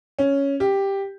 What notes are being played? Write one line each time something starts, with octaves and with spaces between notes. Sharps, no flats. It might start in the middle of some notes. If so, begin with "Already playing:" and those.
C#4
G4